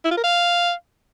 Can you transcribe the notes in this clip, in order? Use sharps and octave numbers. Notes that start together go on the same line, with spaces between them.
E4
F4
A#4
F5